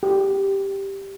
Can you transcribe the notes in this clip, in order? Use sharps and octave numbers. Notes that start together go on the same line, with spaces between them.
G4